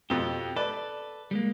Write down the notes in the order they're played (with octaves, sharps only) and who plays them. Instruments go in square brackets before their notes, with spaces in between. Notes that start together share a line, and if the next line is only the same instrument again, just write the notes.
[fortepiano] F2 B2 [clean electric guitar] G4
[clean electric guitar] A4 [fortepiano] B4 D5
[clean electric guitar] G3 G#3 A#3